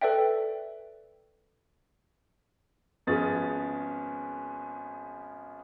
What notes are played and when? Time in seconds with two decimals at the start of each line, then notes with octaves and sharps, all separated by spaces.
0.01 A4 B4 D5 E5 G5
3.07 G#1 F3 B3 C#4 G#4 A6